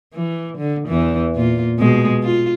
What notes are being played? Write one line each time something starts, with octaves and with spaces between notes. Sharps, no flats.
E3
D3
E2 E3
A#2 F4
B2 G#3
F4